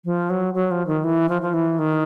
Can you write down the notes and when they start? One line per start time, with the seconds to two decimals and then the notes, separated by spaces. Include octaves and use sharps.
0.05 F3
0.30 F#3
0.54 F#3
0.71 F3
0.87 D#3
1.04 E3
1.29 F3
1.42 F3
1.54 E3
1.79 D#3